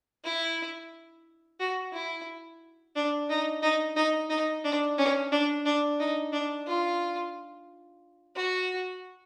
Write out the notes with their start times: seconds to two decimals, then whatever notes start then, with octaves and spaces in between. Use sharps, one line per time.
0.24 E4
1.60 F#4
1.93 E4
2.95 D4
3.29 D#4
3.63 D#4
3.96 D#4
4.30 D#4
4.64 D4
4.98 C#4
5.32 D4
5.65 D4
6.00 D#4
6.33 D4
6.66 F4
8.36 F#4